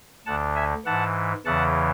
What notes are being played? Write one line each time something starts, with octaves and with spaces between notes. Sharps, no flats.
D2 D3 F#5 A5
E5 G#5
G#2 E3 F#5 A5
E2 C#3 E3 F#5 A5